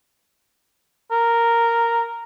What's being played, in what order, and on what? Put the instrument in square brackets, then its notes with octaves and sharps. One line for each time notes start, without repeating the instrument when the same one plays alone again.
[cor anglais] A#4